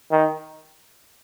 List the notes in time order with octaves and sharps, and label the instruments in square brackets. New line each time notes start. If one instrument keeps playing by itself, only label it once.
[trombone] D#3